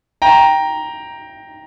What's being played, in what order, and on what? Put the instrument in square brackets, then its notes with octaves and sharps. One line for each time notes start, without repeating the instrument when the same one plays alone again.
[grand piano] G5 A#5